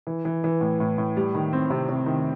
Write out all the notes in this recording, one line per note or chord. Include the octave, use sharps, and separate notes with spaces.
E3
E3
E3
A2
A2
A2
G3
D#3
C4
C3
C3
D#3